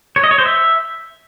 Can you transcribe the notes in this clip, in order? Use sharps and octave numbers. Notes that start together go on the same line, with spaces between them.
C#5
D#5
C#5
C5
E5